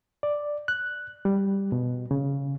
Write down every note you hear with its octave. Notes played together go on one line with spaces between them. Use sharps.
D5
F#6
G3
B2
C#3